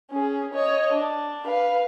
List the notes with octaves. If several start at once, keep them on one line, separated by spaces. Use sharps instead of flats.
C#4 G#4
C#5 D#5
D4
B4 F5